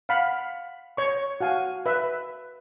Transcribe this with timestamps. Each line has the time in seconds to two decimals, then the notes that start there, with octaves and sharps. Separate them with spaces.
0.09 F5 F#5 B5
0.97 C#5 C#6
1.41 F#4 F5 G#5
1.86 B4 E5